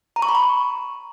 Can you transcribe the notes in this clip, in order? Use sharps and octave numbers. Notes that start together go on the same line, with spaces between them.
A#5
C#6
B5
C#6